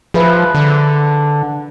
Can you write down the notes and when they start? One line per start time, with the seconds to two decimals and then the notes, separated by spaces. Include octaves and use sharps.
0.14 F3 G#4 B4 E5
0.55 D3